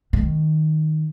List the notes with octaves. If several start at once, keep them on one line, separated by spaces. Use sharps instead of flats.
D#3